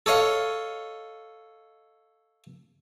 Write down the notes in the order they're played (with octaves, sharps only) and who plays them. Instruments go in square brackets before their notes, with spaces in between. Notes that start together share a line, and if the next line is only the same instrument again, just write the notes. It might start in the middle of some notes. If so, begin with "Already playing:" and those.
[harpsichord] A4 C#5 D#5 F5